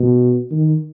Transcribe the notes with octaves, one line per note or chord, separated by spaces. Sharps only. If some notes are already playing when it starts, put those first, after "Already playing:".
Already playing: B2
D#3